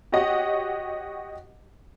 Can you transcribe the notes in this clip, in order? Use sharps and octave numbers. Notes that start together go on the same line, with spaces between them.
F#4 G4 C#5 D#5 F#5